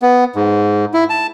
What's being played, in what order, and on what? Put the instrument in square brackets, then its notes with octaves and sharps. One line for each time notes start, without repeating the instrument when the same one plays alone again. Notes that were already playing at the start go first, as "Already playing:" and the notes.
[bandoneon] B3
G#2
E4
A5